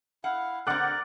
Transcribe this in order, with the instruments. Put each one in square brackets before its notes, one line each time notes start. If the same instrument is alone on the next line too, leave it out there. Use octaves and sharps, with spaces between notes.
[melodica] E4 F5 [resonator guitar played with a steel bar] F#5
[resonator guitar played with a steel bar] D3 C4 [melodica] A#4 D5 [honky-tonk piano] F#5 D6 F#6